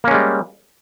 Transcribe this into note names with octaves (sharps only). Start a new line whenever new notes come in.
G3 G#3 A#3 C#4